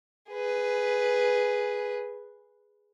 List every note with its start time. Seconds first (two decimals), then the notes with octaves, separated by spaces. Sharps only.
0.31 G#4 B4